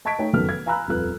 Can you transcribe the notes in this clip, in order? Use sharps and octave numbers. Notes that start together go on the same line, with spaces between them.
D#5 A5 C#6 G#6 B6 D7
A3 D#4 C#5 G5
F#1 D#3 F#3 B3 A4 F6
G#6
F5 G#5 A#5 B5 E6 F#6
D#1 F2 F4 A4 B4 F#6